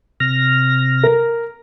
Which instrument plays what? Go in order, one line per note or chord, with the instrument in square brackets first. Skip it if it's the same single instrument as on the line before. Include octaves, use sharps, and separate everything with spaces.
[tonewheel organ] C3 F6 A#6
[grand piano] A#4